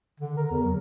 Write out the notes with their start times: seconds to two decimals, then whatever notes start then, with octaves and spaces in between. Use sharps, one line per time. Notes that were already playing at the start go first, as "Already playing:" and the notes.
0.20 D3
0.37 A#4
0.51 E2
0.64 F#3